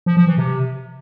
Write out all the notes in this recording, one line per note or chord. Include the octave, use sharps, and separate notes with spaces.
F3
F3
E3
C3